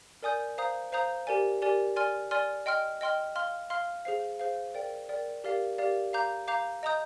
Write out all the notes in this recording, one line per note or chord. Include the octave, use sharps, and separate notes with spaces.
A#4 D5 G#5 D#6 G6
C5 F5 A#5 D#6 G6
C5 F5 A#5 D#6 G6
G4 A#4 D5 G#5
G4 A#4 D5 G#5
D5 G#5 C6 F6
D5 G#5 C6 F6
D#5 G5 C6 F6
D#5 G5 C6 F6
F5 C6 F6
F5 C6 F6
G#4 C5 F5
G#4 C5 F5
A#4 D5 G5
A#4 D5 G5
G4 A#4 D5 F5
G4 A#4 D5 F5
F5 A#5 D6 G6
F5 A#5 D6 G6
D#5 A#5 D#6 G6